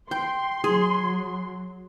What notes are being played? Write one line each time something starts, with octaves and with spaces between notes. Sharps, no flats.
G5 C6
F#3 G#4